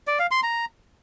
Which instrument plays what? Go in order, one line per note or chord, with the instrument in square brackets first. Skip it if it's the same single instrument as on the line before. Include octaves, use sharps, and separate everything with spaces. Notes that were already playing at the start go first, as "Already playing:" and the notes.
[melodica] D5
F5
C6
A#5